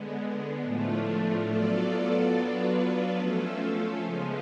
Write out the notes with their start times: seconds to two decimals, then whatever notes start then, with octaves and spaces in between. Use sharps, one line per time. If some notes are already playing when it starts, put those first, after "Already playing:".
Already playing: D3 G#3 B3
0.63 A2 F3 A3 D4 F4
1.47 F#3 B3 F4 A4 D5
2.32 F#3 B3 D4 F4 B4
3.16 F3 A3 C#4 F4 A4
4.01 C#3 F3 G#3 B3 F4